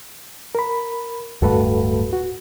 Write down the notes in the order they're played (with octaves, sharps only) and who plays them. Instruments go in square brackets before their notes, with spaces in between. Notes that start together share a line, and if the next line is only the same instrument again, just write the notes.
[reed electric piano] A#4 B5
[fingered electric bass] D1 G2 A3 [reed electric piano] F#4 A4 B4
[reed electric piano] F#4